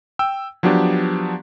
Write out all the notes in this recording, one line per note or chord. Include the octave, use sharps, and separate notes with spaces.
G5 E6
F3 F#3 B3 D4 G4